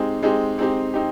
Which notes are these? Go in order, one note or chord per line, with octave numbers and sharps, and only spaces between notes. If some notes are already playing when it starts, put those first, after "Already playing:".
Already playing: G#3 C4 D#4 G4
G#3 C4 D#4 G4
G#3 C4 D#4 G4
C4 D#4 G4